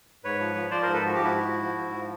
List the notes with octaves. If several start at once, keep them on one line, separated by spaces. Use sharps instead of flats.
G#2 B4 C#5
F3
F3
F3 C5 D5
G#2 A#4 C5
A4 B4
F3 F#4
G#2 G4
E4 F#4
G#2
F3
F3
G#2
F3